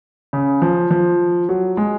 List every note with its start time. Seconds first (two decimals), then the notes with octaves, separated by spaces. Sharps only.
0.33 C#3
0.62 F3
0.91 F3
1.49 F#3
1.77 G#3